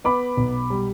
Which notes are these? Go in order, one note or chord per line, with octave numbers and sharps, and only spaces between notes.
B3 B5 D6
B1
G3